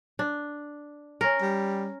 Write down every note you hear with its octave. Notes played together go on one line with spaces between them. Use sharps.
D4
C#4 A#4
G3